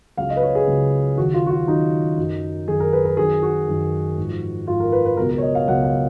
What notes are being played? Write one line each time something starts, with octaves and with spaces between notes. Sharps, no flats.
C#2 C#3 F#3 F5
D#5
B4
C#5
G#4
C#2 C#3 F#3
D#2 C#3 F#3 F#4
F4
F#4
F4
D#2 C#3 F#3 D#4
F#2 D#3 F#3
F#2 D#3 F#3 G#4
A#4
B4
A#4
F#2 D#3 F#3 G#4
F#4
F#2 D#3 F#3
G#2 F3
G#2 F3 F4
A#4
B4
B4
C#2 B2 F#3 A#4
A#4
C#5
D#5
F5
C#2 B2 F#3 F#5
F5